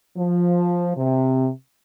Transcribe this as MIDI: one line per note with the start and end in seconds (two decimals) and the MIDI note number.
0.17 0.92 53
0.96 1.48 48